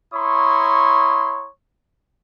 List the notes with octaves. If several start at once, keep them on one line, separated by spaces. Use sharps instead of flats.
E4 C#5 A#5 C6 C#6 D#6